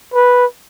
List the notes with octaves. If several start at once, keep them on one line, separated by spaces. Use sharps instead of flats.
B4